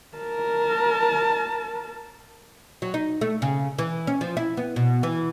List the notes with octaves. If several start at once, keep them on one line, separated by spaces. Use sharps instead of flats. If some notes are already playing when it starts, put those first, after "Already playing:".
A#4 A5
F#3
D#4
A3
C#3
E3
C#4
F3
E4
B3
B2
E3